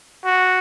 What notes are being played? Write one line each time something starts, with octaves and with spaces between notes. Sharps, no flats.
F#4